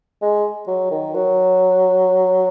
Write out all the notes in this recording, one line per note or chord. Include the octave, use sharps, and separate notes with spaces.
G#3
F#3
D#3
F#3